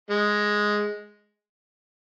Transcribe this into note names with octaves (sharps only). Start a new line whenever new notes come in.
G#3